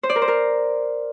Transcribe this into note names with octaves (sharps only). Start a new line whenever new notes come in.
C5
D5
A#4
C5
A#4